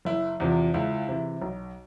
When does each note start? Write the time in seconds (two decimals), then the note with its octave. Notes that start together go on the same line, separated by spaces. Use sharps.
0.05 F#1 E4
0.40 E2 C3 F3
0.74 C#2 E4
1.08 C3 E3
1.42 B1